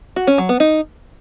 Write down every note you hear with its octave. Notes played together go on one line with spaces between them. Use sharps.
F#4
C#4
F#3
B3
D#4